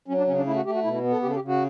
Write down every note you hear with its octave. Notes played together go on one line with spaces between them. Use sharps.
F#3 C#4
D4
C#3 C#4
D4
A3 E4
F#4
A3 G4
F#4
B2 E4
E4
B3
A4
C#3 G4
A4
G4
C#3
F#4